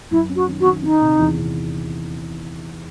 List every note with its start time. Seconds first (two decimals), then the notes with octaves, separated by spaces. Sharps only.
0.11 F#2 E4
0.29 C#4
0.35 F#4
0.48 D#3
0.60 F#4
0.65 D#3
0.83 D#3 D#4
1.01 C3
1.19 E2
1.38 C3